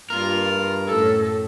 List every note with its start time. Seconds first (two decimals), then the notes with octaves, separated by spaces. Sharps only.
0.10 G2 A#3 F4 A#4
0.87 F#2 A2 A4